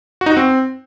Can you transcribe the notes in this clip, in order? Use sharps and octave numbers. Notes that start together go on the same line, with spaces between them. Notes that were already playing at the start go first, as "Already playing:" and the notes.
F#4
D#4
F#4
C4